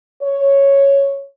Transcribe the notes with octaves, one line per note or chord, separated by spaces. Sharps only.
C#5